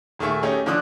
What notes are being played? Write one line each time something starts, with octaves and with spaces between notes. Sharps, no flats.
D#1 D#3 A3 G#4 E5 C#6
A3 C#4 D#4 G4 G#4
D3 F3 D4 D6 D#6 F#6